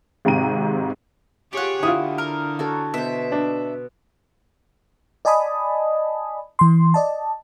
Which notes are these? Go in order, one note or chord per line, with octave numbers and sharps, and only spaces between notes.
G#1 G#2 C3 G5 A#5 D#7
F4 G4 G#4 C#5 F#5
D3 E4 F4 D#6
A#4
F#4 A4 C#5
B2 C5 E5
D4
D5 D#5 G#5 A5 B5 D#6
E3 C6
D5 D#5 A5